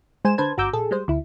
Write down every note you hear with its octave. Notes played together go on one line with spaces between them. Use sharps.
G#3 C5 G#5 E7
D3 B4 C5 A5 G#6
G1 F#4 A#5 D6 E6 G6
A#1 G#4 A4
G3 G#3 C5
D2 E4